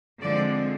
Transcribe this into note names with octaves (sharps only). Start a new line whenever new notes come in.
D3 F3 G#3 C4 D5